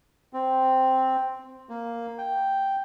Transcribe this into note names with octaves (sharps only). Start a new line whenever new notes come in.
C4
A#3
G5